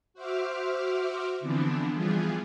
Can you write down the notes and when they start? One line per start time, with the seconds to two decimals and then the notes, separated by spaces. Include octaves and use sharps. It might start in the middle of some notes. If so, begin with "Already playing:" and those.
0.14 F#4 C5 E5 D6 F6
1.40 D3 E3 F3 B3 C4 D4
1.92 E3 F3 G3 B3 F4 G#4